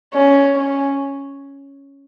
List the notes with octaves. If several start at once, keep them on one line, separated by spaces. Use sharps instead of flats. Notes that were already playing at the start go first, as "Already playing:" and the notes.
C#4
C#4